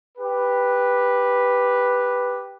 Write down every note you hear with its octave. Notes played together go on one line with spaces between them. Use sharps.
G4 B4